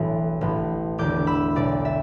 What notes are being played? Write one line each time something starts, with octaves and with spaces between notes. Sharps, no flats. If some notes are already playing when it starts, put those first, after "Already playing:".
Already playing: E1 B1 A2 E3
A1 A2 E3
E1 E2 D3 D6 G6
B5 E6
B1 B2 D5
E5